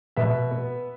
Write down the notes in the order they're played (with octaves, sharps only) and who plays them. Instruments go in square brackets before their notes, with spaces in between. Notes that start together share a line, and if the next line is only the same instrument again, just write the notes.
[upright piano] B2 B4 E5
B3